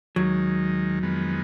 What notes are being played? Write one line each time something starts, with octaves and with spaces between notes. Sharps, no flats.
D#2 D#3 F#3 G#3
F2 D#3 G#3 B3